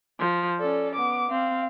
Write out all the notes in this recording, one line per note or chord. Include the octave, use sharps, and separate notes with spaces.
F3
C#4 A4 D5
B3 D6
C4 F5